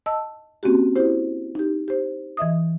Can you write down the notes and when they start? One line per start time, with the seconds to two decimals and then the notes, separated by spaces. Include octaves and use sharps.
0.06 D#5 A5 E6
0.63 A#3 C4 C#4 F#4 G4
0.96 E4 G4 C5
1.55 D#4 G4
1.88 G4 C5
2.37 E3 D#5 E5 D#6